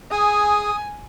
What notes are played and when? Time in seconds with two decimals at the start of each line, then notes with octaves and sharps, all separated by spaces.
0.12 G#4 G#5 D#6